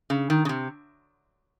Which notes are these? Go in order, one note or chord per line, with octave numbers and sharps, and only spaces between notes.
C#3
D#3
C#3
C3